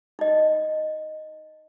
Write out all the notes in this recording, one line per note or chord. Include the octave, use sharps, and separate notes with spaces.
D#4 D#5